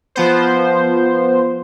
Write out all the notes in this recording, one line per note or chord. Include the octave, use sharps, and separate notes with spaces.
F3 B3 C5